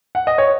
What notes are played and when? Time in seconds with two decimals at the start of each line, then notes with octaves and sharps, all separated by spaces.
0.15 F#5
0.27 D#5
0.38 C#5